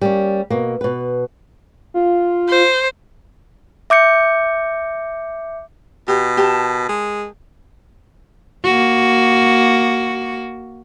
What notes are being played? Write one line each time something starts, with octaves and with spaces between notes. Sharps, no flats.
G3 A#3 C#4
B2 A#3
B2 B4
F4
C5
E5 D6 G6 C#7
B2 G4
G4 A#4 A5
G#3
A#3 F#4